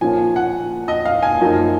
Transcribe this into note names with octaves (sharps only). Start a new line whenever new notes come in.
A#2 F3 A#3 C#4 F4 G#5
F#5
D#5
F5
G#5
F#2 F3 A#3 D#4